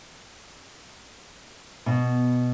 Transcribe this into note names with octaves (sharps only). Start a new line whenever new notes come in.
B2